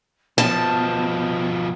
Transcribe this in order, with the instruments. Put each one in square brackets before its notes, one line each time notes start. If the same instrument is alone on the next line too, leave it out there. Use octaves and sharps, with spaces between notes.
[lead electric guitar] B2 F3 [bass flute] B3 [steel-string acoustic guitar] A5